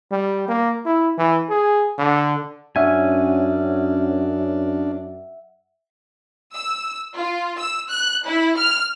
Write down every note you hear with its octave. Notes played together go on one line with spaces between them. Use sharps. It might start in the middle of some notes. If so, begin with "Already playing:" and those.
G3
A#3
E4
E3
G#4
D3
F#2 C#4 D4 E5 F#5 G#5
E6
F4
E6
F#6
E4
F6